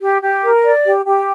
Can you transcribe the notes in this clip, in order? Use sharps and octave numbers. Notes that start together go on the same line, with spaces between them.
G4
G4
A#4
D5
G4
G4